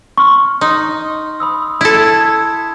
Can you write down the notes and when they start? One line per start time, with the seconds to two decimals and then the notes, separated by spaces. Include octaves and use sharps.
0.18 C6 C#6 F6
0.61 D#4 C6
1.40 B5 D#6 E6
1.81 E4 A4 B5 G#6